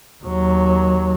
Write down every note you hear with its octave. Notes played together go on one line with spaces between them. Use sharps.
D#2 F#3